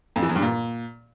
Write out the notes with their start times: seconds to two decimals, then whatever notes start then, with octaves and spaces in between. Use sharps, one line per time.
0.16 F2
0.22 E3
0.29 E2
0.35 G2
0.42 A#2